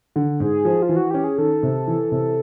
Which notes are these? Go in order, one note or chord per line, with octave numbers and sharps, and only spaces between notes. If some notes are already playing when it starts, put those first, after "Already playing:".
D3
G#2 G#4
F3
F4
E3
F#4
C#4 G4
G#4
D#3 A4
C3
E3
C3